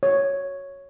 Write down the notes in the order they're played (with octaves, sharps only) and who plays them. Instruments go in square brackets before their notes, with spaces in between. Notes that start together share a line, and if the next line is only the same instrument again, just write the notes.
[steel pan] C#5